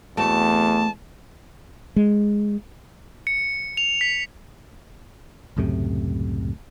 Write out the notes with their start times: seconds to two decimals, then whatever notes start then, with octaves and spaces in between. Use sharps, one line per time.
0.17 E2 A3 C4 F#4 A5
1.96 G#3
3.27 C#7
3.77 F7
4.01 B6
5.57 C#2 F#2 A2 C3